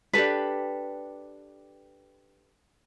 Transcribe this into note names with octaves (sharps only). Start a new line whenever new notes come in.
D4 G4 A4 B4